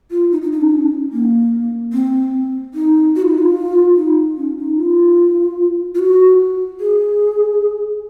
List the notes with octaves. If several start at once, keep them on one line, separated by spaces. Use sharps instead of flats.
F4
D#4
D#4
D#4
C#4
D#4
C#4
A#3
C4
D#4
F#4
F4
D#4
F4
D#4
C#4
D#4
F4
F4
F#4
G#4